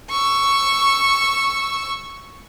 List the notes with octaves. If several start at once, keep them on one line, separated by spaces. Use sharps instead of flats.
C#6 E6